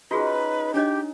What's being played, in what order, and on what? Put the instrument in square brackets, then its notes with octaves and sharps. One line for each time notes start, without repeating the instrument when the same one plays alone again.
[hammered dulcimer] C#4 D#4 [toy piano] F4 F#4 G#4 [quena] B4
[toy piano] D4 C#5 D#5 [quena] G4